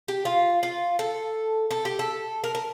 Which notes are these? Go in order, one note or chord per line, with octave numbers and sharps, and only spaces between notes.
G4
F4
F4
A4
A4
G4
A4
A#4
A#4